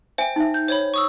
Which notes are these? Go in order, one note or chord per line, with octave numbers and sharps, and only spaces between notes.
C5 E5 G5 G#5
D#4 E5
G6
C5 C#5 B5
C#6 D#6 E6